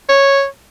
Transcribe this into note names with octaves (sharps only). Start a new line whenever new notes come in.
C#5